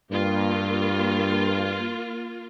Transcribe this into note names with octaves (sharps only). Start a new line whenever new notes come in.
G2 A#3 F4